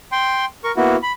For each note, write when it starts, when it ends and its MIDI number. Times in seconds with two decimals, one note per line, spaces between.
0.12 0.45 79
0.12 0.45 84
0.64 0.72 70
0.64 0.72 85
0.77 0.96 58
0.77 0.96 59
0.77 0.96 64
0.77 0.96 66
1.03 1.12 83